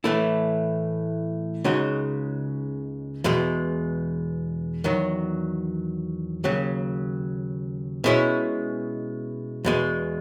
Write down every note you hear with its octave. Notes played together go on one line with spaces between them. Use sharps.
A2 E3 A3 E4
C#2 C#3 G#3 D#4 F#4
E2 B2 G#3
E2 D#3 F#3
D#2 C#3 F#3
B2 G#3 C#4 E4
E2 B2 G#3